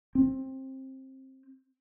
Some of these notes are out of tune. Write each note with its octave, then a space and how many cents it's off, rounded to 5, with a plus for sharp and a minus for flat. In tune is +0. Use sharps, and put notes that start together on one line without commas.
C4 +20